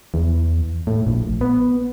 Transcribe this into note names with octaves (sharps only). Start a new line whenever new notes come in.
E2
A2
A#1
B3